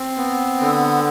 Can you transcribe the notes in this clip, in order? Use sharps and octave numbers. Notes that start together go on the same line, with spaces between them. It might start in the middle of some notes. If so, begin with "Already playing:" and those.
Already playing: C4
B3
D3